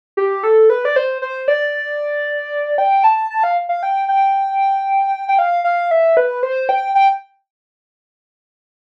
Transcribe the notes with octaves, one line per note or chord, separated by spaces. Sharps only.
G4
A4
B4
D5
C5
C5
D5
G5
A5
A5
F5
F5
G5
G5
G5
F5
F5
E5
B4
C5
G5
G5